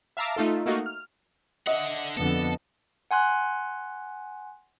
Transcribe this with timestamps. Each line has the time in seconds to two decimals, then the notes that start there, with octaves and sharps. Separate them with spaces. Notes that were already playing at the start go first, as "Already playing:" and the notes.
0.17 E5 F5 A5 A#5 D6
0.36 A3 D#4 F4 A4
0.66 A3 A#3 D#4 F#4
0.86 F6
1.67 D3 D#5 E5 F#5
2.17 F2 D3 B3 A4
3.11 F#5 G#5 C6 F#6